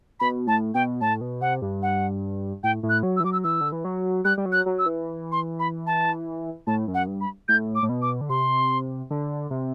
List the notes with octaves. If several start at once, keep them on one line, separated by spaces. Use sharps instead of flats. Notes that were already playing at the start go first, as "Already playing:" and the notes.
B2 B5
A2 A5
B2 G5
A2 A5
B2
C3 F#5
G2
F#5
A2 G5
A2
F#6
F#3
E6
E3
F#3 D6
E6
E3 E6
D3
E3
F#3
G3 F#6
G3
F#3
F#6
F#3
E6
E3
C6
B5
A5
A2 A5
F#2
F#5
G2
B5
A2 G6
D6
A2
B2
D6
D3
C3 C6
D3
C3